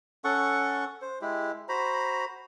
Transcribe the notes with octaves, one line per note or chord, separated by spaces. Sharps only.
C#4 A4 F#5 C#6
C5
G#3 E4 G4
F#4 C5 A#5 B5